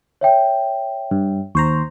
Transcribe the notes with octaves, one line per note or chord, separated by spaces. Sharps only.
C#5 E5 G5
G2
D#2 C5 A#5 C#6